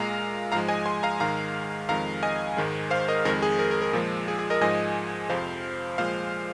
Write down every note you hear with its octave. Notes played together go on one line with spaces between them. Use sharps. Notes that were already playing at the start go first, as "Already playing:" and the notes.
Already playing: A#2 G#3 F5 A#5
G#2 F3 G#3 F5 A#5
D#5 G#5
G#5 C6
F5 A#5
G#2 D#3 G#3 F5 A#5
F2 D#3 G#3 F5 A#5
D#5 G#5
G#2 D#3 G#3
C5 F5
A#4 D#5
F2 D#3 G#3 A#4
G#4
A#4
A#4
A#4
A#2 F3 G#3
G#4
G#4
A#4 D#5
G#2 F3 G#3 D#5 G#5
F2 C3 F3 C5 F5
A#2 F3 G#3 C5 F5